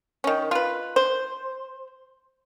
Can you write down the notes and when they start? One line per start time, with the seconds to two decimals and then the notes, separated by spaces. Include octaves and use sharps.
0.24 D#3 C#4
0.51 F4 B4
0.96 C5